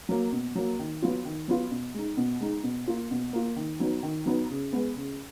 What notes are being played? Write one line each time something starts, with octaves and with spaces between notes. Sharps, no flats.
F#3 A#3
B2
F#3 A#3
D#3
F#3 B3 F4
D#3
F#3 B3 F4
B2
G#3 D#4
B2
G#3 D#4
B2
A#3 F4
B2
A#3 F4
D#3
F#3 B3 D#4
D#3
F#3 B3 D#4
C#3
G#3 B3
C#3